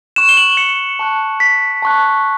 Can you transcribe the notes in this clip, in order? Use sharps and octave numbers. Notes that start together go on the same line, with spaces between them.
C#6 F#6 E7
G7
F#7
C#7
A5 C#6 F#6
B6
A5 C#6 F#6